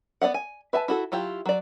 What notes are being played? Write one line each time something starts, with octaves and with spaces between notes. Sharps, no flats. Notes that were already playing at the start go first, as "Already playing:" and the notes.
B3 D5 F5 F#5
G#5
B4 E5 G#5 A5
E4 F#4 A4
F#3 E4 F4 G4
F#3 D5